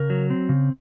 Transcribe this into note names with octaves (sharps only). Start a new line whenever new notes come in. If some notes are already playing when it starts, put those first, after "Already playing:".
Already playing: C#3 A#4
F#3
C4
C#3